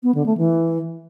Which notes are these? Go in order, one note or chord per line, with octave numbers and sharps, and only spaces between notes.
B3
D3
A3
E3